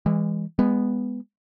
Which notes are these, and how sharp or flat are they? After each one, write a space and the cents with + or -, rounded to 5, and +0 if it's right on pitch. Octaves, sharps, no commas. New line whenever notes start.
E3 +0 G#3 -30
G#3 -20 B3 +0